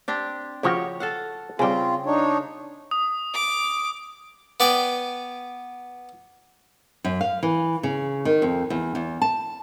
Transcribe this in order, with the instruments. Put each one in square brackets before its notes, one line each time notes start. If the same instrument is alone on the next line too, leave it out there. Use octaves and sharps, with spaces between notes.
[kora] C4 D4 G4
[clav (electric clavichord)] C#3 F3 F#4 [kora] G4 C#5 G5
[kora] A4 F5 F#5
[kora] C#3 G5 [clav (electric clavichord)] G3 G#4 [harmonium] C4 F4
[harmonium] D4 D#4 C#5
[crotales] D#6
[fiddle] D6
[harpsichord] B3 D5 G5 G#5
[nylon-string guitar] F#2
F5
E3
C#3
D#3
F2
E2
E2
A5